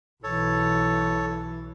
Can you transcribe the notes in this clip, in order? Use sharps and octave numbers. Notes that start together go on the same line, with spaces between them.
B1 E3 A4 C#5